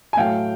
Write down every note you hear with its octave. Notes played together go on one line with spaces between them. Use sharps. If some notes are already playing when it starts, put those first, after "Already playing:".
G#5
A2 F#3 A3 F5 G5